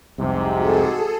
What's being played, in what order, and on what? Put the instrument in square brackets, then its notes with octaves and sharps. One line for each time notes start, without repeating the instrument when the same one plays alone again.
[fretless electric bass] F1 C2 [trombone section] G#2 C3
[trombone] F#4 [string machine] G#4 A4